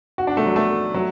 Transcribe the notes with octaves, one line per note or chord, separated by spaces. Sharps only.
F#4
D4
A3
F#3
A3
F#3